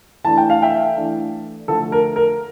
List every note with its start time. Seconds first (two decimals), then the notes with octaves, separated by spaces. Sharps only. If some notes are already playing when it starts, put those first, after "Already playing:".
0.24 E3 A3 D4 A5
0.38 G5
0.50 F5
0.62 E5 G5
0.97 E3 A3 D4
1.68 D3 F3 A3 A4
1.92 A#4
2.16 A#4